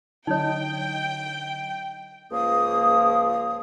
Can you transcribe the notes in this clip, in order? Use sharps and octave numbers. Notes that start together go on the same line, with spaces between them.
D3 F#3 D#4 C#5 D#5 G5
C#2 F3 A#3 D#6